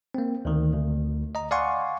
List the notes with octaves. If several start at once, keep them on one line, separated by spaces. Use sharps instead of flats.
A#3 C4
D2 D#3
D2
D#5 A#5
D5 F5 F#5 G#5 C6 C#6